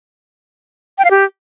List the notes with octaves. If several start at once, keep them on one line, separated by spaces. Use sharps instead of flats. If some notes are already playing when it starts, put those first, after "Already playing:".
G5
F5
G4